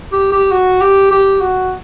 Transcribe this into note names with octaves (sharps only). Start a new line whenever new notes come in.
G4
G4
F#4
G4
G4
F#4